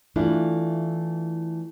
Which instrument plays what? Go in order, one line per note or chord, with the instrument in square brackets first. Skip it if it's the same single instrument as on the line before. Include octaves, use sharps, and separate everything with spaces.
[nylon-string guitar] E3 A3 D4 E4 F4